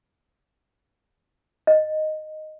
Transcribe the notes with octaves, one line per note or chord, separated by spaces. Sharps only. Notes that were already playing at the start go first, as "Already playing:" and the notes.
D#5